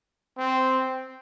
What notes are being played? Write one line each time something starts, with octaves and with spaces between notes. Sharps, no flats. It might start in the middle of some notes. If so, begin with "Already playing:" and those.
C4